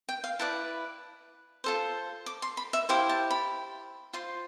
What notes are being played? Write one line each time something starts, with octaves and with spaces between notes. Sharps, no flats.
G5
F5
E4 B4 D5 A5
F4 A4 C5
D6
C6
B5
E5
E4 G4 C5 F5
A5
B5
F4 C5 C6